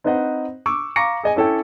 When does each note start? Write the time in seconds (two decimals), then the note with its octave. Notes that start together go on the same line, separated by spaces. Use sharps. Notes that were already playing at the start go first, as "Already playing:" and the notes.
0.04 C4 D#4 B4 C5 D#5 F#5
0.66 C#6 D6 E6
0.96 F5 A#5 C#6 D6 A#6 C#7
1.24 G#4 D#5 G#5
1.36 C#4 E4 A4 C#5 G5